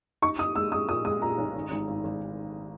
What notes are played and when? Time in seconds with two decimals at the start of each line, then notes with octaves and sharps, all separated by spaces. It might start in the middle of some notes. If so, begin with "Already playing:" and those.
0.22 D#4 C#6
0.38 D#4 D#6
0.55 G#3 E6
0.72 G#3 D#6
0.89 A#2 D#6
1.05 G#3 D#6
1.21 A#2 A#5
1.38 B1
1.55 G#1
1.71 G#1
1.88 G#1
2.04 G#1